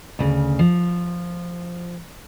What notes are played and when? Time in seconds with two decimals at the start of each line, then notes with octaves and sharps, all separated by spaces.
0.19 D2 C#3
0.59 F3